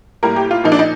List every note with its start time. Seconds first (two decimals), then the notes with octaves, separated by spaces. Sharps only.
0.23 A2 G3 A#3 A#4
0.36 G4
0.51 F4
0.64 A#2 F3 A#3 D#4
0.72 D4
0.79 D#4